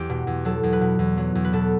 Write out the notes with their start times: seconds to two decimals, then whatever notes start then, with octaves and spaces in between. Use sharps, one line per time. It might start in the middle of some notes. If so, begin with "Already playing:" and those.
Already playing: E2 G4
0.10 B2
0.27 E2
0.45 F#3 A4
0.63 E2
0.73 B4
0.81 B2
0.99 E2
1.17 F#3
1.35 E2
1.45 B4
1.53 B2 A4